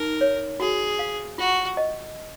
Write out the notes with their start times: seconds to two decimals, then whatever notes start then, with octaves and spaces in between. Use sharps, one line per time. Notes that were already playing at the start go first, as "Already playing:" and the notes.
Already playing: D#4 A#4
0.21 C#5
0.60 F#4 G#4
0.99 F5
1.38 F4 F#4
1.77 D#5